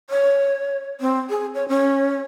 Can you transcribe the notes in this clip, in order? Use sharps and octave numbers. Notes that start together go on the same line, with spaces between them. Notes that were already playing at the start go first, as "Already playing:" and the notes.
C#5
C4
G#4
C#5
C#4